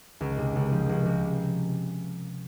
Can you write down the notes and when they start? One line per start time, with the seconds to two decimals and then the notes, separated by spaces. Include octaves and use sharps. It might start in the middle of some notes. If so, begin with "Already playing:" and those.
0.21 C#2
0.38 C3
0.56 C#2
0.72 F3
0.89 C#2
1.06 C3